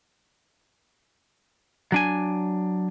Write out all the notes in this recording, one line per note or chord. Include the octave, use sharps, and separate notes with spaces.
F#3 D4 G#5